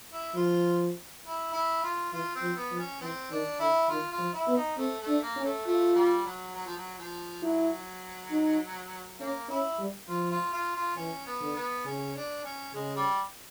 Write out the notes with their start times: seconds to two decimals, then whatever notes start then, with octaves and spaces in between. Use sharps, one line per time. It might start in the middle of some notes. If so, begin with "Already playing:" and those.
0.12 E4
0.35 F3 F4
1.24 E4
1.53 E4
1.83 F4
2.12 E3 F4
2.35 C4
2.41 F3
2.56 B3
2.71 F3
2.78 C#4
3.01 E3 C4
3.30 D#3 D4
3.60 D3 E4
3.88 D#3 F4
4.12 F4
4.18 F3
4.33 E4
4.47 B3
4.56 D#4
4.77 A3 C4
5.00 A3
5.08 D4
5.22 A#3
5.36 C#4
5.44 A3
5.65 A3 F4
5.95 G3
6.25 F#3
6.55 F#3
6.66 F3
6.77 F#3
6.98 F3
7.42 F#3 E4
8.31 D#4
9.19 A#3 C#4
9.49 C#4 E4
9.79 G3
10.08 F3 F4
10.31 F4
10.53 F4
10.75 F4
10.96 E3 C#4
11.26 B3
11.41 D3
11.56 B3
11.86 C#3 C#4
12.15 D4
12.44 C#4
12.74 C#3 G#3
12.96 G3